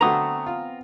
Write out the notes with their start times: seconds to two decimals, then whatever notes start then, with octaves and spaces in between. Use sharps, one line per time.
0.01 D3 A3 B3 C4 F#4 A#5 D#6
0.47 F4